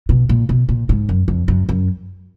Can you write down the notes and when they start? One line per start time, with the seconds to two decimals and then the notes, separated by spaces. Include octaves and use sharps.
0.09 B2
0.29 A#2
0.49 B2
0.69 A#2
0.89 G#2
1.09 F#2
1.28 F2
1.48 F#2
1.69 F#2